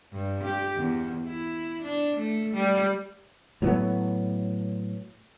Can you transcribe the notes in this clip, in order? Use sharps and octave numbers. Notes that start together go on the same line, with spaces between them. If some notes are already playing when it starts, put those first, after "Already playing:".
G2
G4
E2
E4
D4
A3
G3
A2 F#3 B3